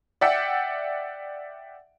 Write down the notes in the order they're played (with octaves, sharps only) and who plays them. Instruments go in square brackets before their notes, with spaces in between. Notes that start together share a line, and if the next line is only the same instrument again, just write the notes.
[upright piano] D5 E5 F#5 G5